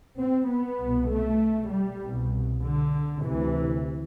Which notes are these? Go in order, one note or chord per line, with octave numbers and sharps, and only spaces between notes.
C4
B3
C2 B2
A3
G3
C2 B2
D3
D2 C3 E3